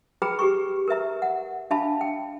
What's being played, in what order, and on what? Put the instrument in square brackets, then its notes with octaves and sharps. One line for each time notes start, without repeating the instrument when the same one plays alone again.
[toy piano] G#4 B4 G5 A#5 B5
G4 G#4 B4 C#6
A#4 B4 E5 A#5
F#5
D4 E5 F5 A5 B5
G5